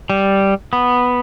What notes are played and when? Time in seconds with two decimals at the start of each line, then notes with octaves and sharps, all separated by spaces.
0.10 G3
0.73 B3